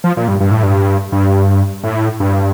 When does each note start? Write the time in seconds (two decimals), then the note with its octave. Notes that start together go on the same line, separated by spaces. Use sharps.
0.04 F3
0.17 A#2
0.28 G2
0.40 G2
0.51 A2
0.63 G2
1.12 G2
1.84 A2
2.20 G2